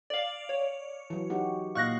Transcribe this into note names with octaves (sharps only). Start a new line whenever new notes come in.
D5 F5
C#5
E3 F#3
D#4 F#4 G4
A#2 D#5 F5 C#6 F#6 A#6